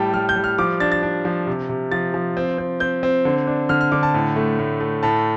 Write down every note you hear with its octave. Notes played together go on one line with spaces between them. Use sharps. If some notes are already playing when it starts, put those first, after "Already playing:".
Already playing: A2 G3 G5 A5
G3 F6
G6
G3
F6
F3 D6
D4 A6
A6
D4
F3
C3
C3
F3 A6
F3
C4
C4
C4 G6
C4
D3
D4
D3 F6
F6
D3 D6
A5
A2
A3
A2
A3
A2 A5